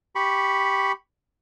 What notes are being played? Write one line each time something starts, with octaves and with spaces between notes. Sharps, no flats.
G4 B5 C#6